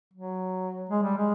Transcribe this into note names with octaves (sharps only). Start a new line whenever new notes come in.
F#3
G#3
G3
G#3